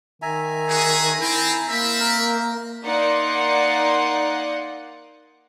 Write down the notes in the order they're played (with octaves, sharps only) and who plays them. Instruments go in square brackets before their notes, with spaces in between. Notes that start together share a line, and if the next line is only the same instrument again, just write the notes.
[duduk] D#3 [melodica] E5 G#5 A#5
[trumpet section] F#4 G#4
[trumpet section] C4 [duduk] E4
[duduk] A#3 [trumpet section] C4 E5
[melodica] A#4
[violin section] A#3 D#4 D5 F#5 C6